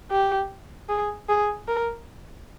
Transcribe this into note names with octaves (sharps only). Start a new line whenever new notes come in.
G4
G#4
G#4
A#4